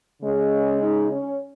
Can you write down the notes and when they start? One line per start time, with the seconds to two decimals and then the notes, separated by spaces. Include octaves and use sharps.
0.22 C#3 G#3 C#4
0.81 D#4
1.11 C#4